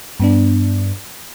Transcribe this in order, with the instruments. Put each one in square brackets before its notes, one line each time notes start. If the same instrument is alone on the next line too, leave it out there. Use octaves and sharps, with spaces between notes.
[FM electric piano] G2 B3 D4